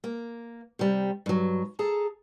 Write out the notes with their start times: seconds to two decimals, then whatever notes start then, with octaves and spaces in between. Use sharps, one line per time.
0.04 A#3
0.79 C3 G3
1.26 G2 F#3
1.79 G#4 A4 A5 A#5